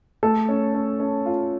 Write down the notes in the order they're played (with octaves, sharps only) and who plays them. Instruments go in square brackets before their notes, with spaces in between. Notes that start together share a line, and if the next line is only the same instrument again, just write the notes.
[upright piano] A3 [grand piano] A4
[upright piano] C#4
C#4
C#4
F4